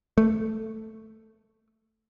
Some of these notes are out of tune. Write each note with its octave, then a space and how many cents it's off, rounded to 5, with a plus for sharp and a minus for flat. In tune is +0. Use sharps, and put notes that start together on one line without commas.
A3 +5